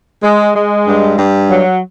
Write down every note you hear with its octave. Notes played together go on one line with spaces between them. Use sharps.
G#3
G#3
G2
G2
F#3